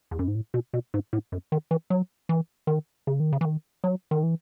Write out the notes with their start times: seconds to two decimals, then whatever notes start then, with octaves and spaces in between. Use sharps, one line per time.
0.11 E2
0.19 F#2
0.28 G#2
0.35 A2
0.54 B2
0.73 B2
0.94 G#2
1.13 A2
1.32 F#2
1.52 D#3
1.71 E3
1.90 F#3
2.29 E3
2.67 D#3
3.07 C#3
3.20 D#3
3.32 C#3
3.41 E3
3.45 D#3
3.84 F#3
4.11 D#3
4.23 E3